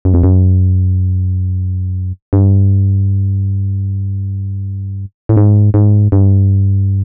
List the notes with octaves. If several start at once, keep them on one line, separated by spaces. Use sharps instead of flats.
F#2
F2
F#2
G2
A2
G#2
G#2
G2